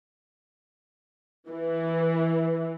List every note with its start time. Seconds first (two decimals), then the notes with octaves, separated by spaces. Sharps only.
1.49 E3